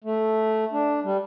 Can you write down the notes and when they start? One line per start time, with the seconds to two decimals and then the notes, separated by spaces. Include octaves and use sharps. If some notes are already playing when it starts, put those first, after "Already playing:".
0.04 A3
0.72 D4
1.04 G3